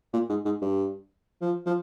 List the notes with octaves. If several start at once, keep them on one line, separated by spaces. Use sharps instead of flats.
A#2
G#2
G#2
G2
F3
F3